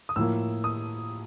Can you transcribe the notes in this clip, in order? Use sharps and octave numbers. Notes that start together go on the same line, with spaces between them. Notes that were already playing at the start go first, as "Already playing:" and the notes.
D#6
A2 F3 A#3 E6
D#6